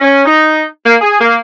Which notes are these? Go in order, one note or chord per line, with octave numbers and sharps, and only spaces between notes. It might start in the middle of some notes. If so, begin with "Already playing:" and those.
C#4
D#4
A#3
G#4
A#3